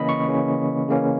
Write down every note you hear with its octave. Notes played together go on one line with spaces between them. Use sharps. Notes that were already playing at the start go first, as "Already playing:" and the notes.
Already playing: C#3 E3 A#3 C#4 D#5 B5
C#6
C#3 E3 A#3 C#4
C#3 E3 A#3 C#4